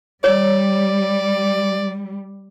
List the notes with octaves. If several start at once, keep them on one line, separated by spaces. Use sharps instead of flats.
G3 C#5 D5